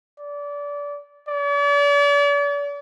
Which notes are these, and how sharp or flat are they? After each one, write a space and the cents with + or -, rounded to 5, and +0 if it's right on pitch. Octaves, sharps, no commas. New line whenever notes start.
D5 -25
D5 -40